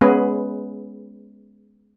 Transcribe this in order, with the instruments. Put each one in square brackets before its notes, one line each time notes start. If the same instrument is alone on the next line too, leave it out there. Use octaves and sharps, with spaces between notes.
[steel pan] G#3 B3 C#4 G#4 B4